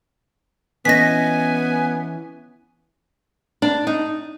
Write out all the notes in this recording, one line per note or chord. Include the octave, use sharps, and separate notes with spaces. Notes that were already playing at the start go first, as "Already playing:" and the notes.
E3 B3 C#4 D#5 G#5 A#6 B6
D4
D#4